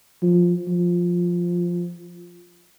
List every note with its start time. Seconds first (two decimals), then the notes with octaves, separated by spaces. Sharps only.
0.22 F3
0.68 F3